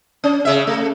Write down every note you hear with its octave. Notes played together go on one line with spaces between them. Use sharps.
C#4
C#3 E5
A3